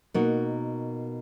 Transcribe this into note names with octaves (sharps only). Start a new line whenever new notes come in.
B2 A#3 D#4 F#4 A#4